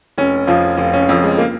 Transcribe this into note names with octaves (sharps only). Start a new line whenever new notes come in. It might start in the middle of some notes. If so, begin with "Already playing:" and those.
F1 C#4
F2 F3 F4
F1 F4
C#4
F2 F3
G#3
A#3